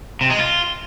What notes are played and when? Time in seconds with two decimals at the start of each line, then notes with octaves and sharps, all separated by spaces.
0.21 C3
0.30 G#3
0.39 F4